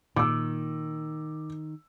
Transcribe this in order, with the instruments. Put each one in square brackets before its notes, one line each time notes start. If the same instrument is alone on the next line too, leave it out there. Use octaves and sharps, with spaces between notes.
[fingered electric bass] A#2 [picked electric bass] D#3 [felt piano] D6 E6